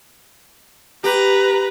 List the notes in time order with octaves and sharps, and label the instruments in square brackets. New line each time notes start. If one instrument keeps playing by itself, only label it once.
[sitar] G4 [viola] B4 A#5